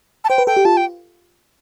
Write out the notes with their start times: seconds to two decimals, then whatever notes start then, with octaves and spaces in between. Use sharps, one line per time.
0.24 A5
0.29 C5 G5
0.38 B4
0.47 A4 G5
0.57 G4
0.65 F4 A5
0.77 G5